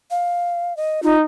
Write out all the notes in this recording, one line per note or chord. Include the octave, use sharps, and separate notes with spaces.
F5
D#5
D#4 F4